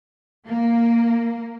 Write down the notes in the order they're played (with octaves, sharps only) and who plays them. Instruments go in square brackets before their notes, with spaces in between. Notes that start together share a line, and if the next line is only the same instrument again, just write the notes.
[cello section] A#3